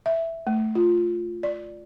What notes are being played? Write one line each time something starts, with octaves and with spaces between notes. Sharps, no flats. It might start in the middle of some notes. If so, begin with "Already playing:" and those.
E5
A3
F4
D5